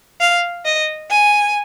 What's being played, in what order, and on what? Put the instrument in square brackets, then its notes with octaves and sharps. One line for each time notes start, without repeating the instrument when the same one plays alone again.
[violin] F5
D#5
G#5